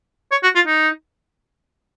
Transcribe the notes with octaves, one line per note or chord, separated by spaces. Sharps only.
C#5
F#4
F4
D#4